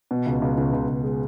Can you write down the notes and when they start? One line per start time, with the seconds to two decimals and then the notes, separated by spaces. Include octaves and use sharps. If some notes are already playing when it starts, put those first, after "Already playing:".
0.11 B2
0.26 C#2
0.42 C#2
0.58 C#2
0.73 C#2
0.88 C#2
1.04 G#3